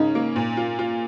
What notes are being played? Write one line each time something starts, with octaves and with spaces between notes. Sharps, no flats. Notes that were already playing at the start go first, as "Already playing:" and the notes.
Already playing: C#3 C#4 D#4
A#3
A#2
F4
F4